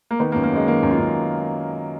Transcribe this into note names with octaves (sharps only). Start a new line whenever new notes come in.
A#3
D#3 B3
A#3
F#2
A#3
F#2 G#3
D#3 A#3
F#2
F4
F#2